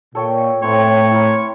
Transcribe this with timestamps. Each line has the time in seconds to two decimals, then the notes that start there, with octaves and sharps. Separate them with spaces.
0.15 A#2 A4 C#5 G5
0.62 A2 C4 B4 C#5
1.11 E4 A#4